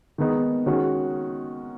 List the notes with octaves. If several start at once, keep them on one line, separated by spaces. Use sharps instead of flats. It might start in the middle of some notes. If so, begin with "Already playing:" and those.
D#3 G#3 B3 D#4
D#3 G#3 C#4 F#4